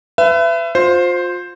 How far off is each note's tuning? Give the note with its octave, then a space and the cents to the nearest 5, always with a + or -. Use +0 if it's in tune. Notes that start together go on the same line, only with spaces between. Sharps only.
B4 +30 E5 +30
F4 +30 C5 +0